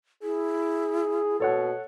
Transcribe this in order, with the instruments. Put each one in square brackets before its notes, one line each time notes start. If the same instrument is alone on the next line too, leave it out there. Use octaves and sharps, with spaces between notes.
[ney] E4 [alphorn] G#4
[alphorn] B2 [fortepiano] A4 C#5 F#5